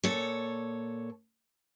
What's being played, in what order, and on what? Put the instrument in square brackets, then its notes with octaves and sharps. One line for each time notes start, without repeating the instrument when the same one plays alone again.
[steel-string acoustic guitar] A#2 A4 C#5